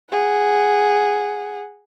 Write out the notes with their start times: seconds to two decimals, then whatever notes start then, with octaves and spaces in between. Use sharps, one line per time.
0.11 G#4 F#5